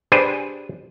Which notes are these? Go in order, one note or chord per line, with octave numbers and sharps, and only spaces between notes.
D4 G4 G#4 B4 C5 D5